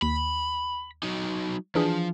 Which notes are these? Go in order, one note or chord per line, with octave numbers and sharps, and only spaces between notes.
D#2 B5
F#3 D#4
E3 F3 D4 G#4